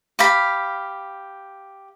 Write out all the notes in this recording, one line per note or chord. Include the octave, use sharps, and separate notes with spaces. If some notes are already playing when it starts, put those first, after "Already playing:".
G4 F5 B5